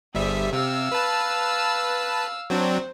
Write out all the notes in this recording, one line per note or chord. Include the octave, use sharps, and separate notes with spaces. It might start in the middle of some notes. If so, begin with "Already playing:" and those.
G1 G3 G#4 C5 E5
C3 F5 E6
B4 A5
F#3 C4 D4 C5